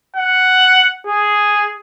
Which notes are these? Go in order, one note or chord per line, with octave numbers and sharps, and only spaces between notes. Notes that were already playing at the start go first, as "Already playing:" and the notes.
F#5
G#4